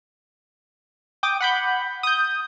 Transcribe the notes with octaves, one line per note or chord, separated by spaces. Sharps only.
G5 D6 D#6
F#5 B5 G6
D#6 G6